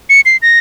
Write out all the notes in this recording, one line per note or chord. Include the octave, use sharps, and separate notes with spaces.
C#7
C7
A#6